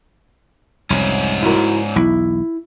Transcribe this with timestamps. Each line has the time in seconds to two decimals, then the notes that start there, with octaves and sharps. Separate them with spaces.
0.90 C2 F2 G#2 C#4
1.42 E4 F#4 A#4
1.96 B1 E2 E4